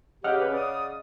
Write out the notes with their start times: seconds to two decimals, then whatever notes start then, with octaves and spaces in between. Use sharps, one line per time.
0.24 C#3 G4 D#5 F#5 F6
0.40 C#4 B4
0.53 D5 D#6